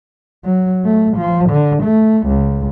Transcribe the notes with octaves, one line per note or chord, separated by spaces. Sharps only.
F#3
A3
F3
D3
A3
C#2